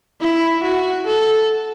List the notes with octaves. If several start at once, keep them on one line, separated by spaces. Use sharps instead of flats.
E4
F#4
A4